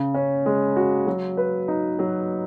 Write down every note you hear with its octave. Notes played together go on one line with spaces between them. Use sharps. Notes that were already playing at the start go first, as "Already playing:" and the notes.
Already playing: C#3
C#4
G#3
F#4
F#3
B4
D#4
F#3